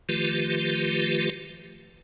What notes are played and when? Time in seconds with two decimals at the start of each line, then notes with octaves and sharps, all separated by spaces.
0.09 D#3 F3 A3 F4 G4 B4